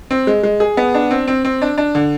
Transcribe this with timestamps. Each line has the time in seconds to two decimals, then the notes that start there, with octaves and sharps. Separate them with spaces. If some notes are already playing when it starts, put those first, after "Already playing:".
0.11 C4
0.27 G#3
0.43 G#3
0.60 G#4
0.77 B3
0.94 D4
1.11 C4
1.28 C4
1.45 C4
1.62 D4
1.78 D4
1.95 D3